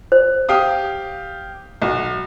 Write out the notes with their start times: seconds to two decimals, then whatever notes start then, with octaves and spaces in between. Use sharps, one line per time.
0.12 C5
0.49 G4 F5 D#6
1.82 B1 F#4